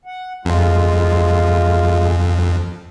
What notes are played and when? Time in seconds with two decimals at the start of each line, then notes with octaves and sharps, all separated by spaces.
0.05 F#5
0.45 F2 G#3 F4